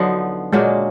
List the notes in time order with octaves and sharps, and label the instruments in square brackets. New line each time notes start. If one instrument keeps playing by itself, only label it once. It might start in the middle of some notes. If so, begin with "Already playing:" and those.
Already playing: [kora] D3 F3 B3 D#4 [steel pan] F#3
[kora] A#2 F#3 A#3 D4 [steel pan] G#3